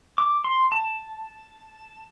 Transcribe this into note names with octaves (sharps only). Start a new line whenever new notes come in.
D6
C6
A5